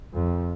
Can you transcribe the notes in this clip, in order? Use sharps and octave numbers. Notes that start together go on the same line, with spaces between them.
F2